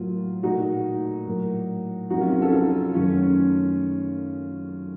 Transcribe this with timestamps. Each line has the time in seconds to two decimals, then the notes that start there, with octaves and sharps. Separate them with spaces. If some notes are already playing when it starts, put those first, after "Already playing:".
Already playing: A2 F#3 A#3 F4
0.43 A#2 A3 D#4 F#4
1.27 A2 F#3 A#3
2.10 F2 C3 F#3 A#3 D#4 F#4
2.21 C#4 F4
2.31 C#4 F4
2.42 F4 A4
2.52 F4 A4
2.94 F#2 D#3 A3 C#4 F4
3.08 C#4
3.23 C#4